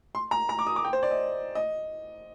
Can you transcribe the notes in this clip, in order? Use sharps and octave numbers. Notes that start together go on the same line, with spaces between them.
C6
A#5
A#5
D6
D#6
D6
G5
C5
D5
D#5
D#5